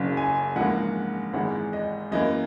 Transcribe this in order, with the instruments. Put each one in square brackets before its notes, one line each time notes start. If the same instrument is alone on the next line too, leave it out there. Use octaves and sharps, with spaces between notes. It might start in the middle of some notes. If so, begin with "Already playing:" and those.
Already playing: [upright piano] F#1 F#2 C#3
G#5
A#1 G#2 E3 A#3 F#5
G#1 G#2 E3 G#3 F#5
D#5
F#2 E3 A#3 D#5